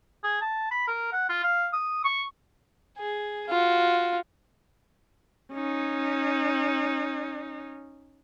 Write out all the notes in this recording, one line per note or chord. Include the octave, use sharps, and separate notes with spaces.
G#4
A5
B5
A#4
F#5
F4
F5
D#6
C#6
G#4
F4 F#4
C#4 D#4